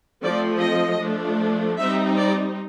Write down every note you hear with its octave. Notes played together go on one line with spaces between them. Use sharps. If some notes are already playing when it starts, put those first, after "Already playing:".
F3 A3 C4 D5
D#5
F3 A3 D4
G3 C4 D#4 E5
D5